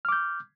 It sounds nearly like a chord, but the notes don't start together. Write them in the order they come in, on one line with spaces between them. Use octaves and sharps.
F6 D6 G6